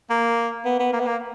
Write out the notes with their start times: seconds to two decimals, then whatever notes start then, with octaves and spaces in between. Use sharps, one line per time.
0.10 A#3
0.65 B3
0.79 B3
0.93 A#3
1.00 B3
1.07 A#3